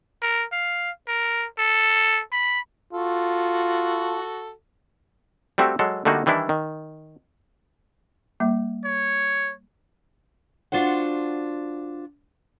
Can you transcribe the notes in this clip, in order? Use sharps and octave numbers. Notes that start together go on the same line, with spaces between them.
A#4
F5
A#4
A4
B5
F4 F#4 A4
G3 A3 C4 F#4 G4
F#3 G#3 A4
D3 G3 A3 A#3 D#4 F#4
D#3 E3 G3 D4 E4
D#3
G3 A#3 E5
C#5
D4 F4 F#4 C5 F#5